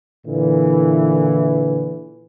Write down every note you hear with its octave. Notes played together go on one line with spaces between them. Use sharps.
A#2 D3 E3